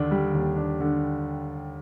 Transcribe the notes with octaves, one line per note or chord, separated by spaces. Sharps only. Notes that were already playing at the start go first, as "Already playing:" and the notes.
Already playing: D#2 D3 D4
G3
D#2
D4
D3